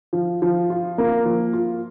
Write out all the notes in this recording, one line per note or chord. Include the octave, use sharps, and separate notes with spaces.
F3
F3
F4
A#3
F3
F4